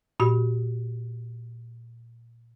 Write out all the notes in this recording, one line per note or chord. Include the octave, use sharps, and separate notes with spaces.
A#2 F#4